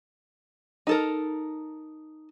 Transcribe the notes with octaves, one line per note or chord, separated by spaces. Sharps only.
D#4 A4 A#4